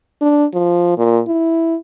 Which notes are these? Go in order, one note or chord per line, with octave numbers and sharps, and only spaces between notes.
D4
F3
A#2
E4